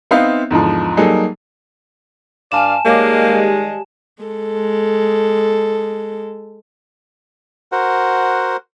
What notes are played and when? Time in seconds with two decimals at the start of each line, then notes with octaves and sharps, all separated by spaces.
0.11 B3 C4 D#4 E5 F5
0.51 E2 G#2 D3 F3
0.97 F#3 G3 A#3 D#4 G#4 A4
2.52 G2 D5 F5 G#5 A5 E7
2.85 D#3 G3 G#3 A#3 C#5 F5 D6
3.24 G4
4.23 G#3 A4
7.72 F#4 A#4 C5 F#5